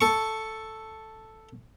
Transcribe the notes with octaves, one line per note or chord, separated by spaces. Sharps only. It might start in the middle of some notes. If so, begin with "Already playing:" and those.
A4 C#6